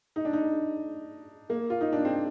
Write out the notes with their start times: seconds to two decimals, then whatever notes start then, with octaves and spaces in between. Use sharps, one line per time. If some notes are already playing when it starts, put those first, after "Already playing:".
0.16 D#4
0.25 D4
0.33 D#4
1.50 A#3
1.70 F4
1.81 D#4
1.92 D4
2.05 C4